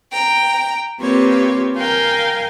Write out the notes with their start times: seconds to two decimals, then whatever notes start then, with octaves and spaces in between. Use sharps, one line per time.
0.12 G5 A#5
1.00 A#3 C4 F4 G4 B4 C#5
1.76 A#4 F5 G5 G#5 A#5